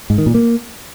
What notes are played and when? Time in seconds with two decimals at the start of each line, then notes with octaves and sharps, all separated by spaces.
0.10 G#2
0.18 D#3
0.26 A#2
0.34 A#3